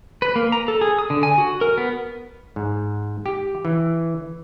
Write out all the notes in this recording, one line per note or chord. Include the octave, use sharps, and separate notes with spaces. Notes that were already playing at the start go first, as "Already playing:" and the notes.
B4
A#3
A#5
A4
G#4
D#6
D3
G#5
F#4
A#4
B3
G#2
G4
E3